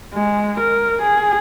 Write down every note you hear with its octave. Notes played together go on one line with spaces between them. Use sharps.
G#3
A#4
G#4